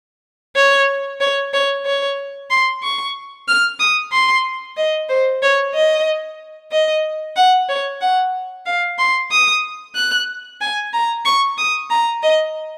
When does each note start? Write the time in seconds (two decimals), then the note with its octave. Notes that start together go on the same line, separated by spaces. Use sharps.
0.56 C#5
1.21 C#5
1.53 C#5
1.86 C#5
2.50 C6
2.83 C#6
3.48 F6
3.80 D#6
4.12 C6
4.77 D#5
5.09 C5
5.42 C#5
5.74 D#5
6.72 D#5
7.36 F#5
7.69 C#5
8.01 F#5
8.66 F5
8.98 C6
9.31 D#6
9.95 F#6
10.61 G#5
10.93 A#5
11.25 C#6
11.58 D#6
11.90 A#5
12.23 D#5